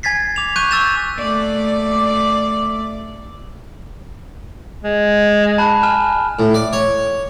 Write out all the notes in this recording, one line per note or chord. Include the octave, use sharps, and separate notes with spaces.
G#5 G#6 A6 B6 C7
D6 F7
C#6 F#6 G6 D#7
C#6 E6 A6 E7
A3 D5
G#3
A5 B5 F#6
G#5 F6 E7
A2
D5
C#5